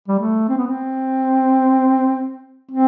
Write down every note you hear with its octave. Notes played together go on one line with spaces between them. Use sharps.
G3
A3
C4
B3
C4
C4